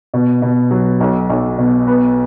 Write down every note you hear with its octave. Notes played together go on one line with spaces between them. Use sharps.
B2
B2
F#3
B1
B1
B2
B3